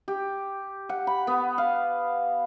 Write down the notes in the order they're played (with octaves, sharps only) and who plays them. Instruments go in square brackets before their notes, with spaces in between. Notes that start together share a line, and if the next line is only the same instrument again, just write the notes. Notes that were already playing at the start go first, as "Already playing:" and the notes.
[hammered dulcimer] G4
F#5
B5
B3
F5